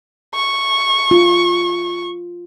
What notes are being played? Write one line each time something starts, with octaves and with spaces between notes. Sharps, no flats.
C#6
F4